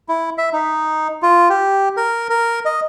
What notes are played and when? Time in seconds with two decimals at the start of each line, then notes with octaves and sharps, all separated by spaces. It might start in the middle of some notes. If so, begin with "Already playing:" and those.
0.09 E4
0.38 E5
0.53 D#4
1.22 F4
1.50 G4
1.97 A#4
2.30 A#4
2.65 D#5